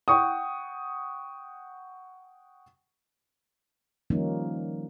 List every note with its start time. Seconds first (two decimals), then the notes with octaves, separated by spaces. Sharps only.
0.08 F#5 G5 C#6 D#6
4.10 D#3 F3 G3 A#3 C#4 D#4